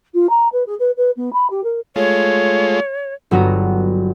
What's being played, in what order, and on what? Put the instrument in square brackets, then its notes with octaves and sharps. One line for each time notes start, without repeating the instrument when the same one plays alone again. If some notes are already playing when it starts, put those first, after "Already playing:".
[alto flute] F4
A#5
B4
G#4
B4
B4
B3
B5
G4
A#4
[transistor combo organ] G#3 A3 F4 [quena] C#5
[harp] G1 F#3 B3 F#4 C#5 A#5